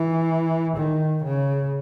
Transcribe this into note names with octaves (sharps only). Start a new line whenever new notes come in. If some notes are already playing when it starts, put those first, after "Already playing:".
Already playing: E3
D#3
C#3